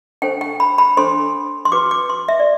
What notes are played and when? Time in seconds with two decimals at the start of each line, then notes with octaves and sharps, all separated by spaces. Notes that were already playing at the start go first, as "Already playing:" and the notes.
0.22 D4 A4 C5 G5
0.41 G5
0.60 B5
0.78 B5
0.97 D4 A4 C5 C6
1.65 C6
1.72 F#4 B4 D6
1.91 D6
2.10 C6
2.28 E5
2.40 D5